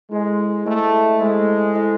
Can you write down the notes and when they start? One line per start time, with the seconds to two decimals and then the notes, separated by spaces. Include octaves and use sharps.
0.11 G#3 E4 A4 C5 D#5 G#5
0.65 A3 E4 A4 C5 D#5 G#5
1.20 G#3 E4 A4 C5 D#5 G#5
1.75 E4 A4 C5 D#5 G#5